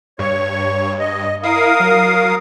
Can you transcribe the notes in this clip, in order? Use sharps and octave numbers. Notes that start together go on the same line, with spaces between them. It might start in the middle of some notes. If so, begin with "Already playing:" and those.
G2 C#5 C#6
D#5
E4 A#4 F5 D#6
F#3